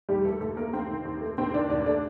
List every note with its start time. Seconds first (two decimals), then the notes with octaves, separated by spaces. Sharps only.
0.09 D#2 G3 G4
0.25 D#3 A3 A4
0.41 D#2 A3 A4
0.57 A3 A#3 A#4
0.73 D#2 C4
0.89 D#3
1.05 D#2
1.21 A3
1.38 D#2 C4
1.54 D#3 D4
1.70 D#2 D4
1.86 A3 D4